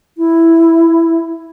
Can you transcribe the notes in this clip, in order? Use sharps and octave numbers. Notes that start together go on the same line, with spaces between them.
E4